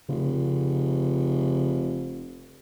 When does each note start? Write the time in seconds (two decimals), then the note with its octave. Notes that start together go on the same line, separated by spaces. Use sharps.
0.09 F1 C#3